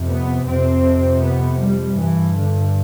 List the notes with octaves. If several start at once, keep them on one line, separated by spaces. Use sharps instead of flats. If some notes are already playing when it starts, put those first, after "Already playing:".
Already playing: F2 C3
B3
F2 C3 C4
B3
G3
G2 E3
D3